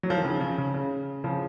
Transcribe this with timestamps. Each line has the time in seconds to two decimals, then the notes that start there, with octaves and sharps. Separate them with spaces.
0.03 F#3
0.10 F3
0.17 D#3
0.24 C#3
0.40 C#3
0.58 C#3
0.74 C#3
1.24 C#3 F3